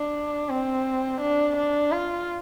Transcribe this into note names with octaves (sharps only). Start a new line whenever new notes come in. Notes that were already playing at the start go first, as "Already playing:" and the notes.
Already playing: D4
C4
D4
D4
F4